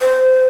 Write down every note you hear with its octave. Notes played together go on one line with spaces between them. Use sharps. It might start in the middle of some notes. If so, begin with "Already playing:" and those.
C5